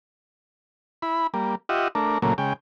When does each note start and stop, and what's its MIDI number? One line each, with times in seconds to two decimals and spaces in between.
1.02 1.27 64
1.02 1.27 83
1.34 1.55 55
1.34 1.55 58
1.69 1.88 65
1.69 1.88 67
1.69 1.88 75
1.69 1.88 76
1.69 1.88 78
1.95 2.18 57
1.95 2.18 62
1.95 2.18 70
2.22 2.34 46
2.22 2.34 49
2.22 2.34 54
2.22 2.34 57
2.22 2.34 58
2.38 2.53 49
2.38 2.53 56
2.38 2.53 79